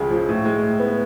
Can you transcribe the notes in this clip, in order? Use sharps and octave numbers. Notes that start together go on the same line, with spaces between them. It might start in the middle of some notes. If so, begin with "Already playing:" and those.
Already playing: C#2 C#3 F3 G#3
F3
A2
G#3
A2
B3